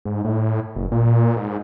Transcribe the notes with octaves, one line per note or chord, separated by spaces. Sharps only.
G#2
A2
F#1
A#2
G#2